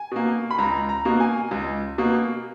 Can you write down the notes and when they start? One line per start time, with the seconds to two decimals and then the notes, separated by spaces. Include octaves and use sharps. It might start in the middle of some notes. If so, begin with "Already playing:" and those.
Already playing: G#5
0.11 B2 A#3
0.51 B5
0.58 C#2 A#5
0.89 A#5
1.05 B2 A#3
1.20 G#5
1.51 C#2
1.98 B2 A#3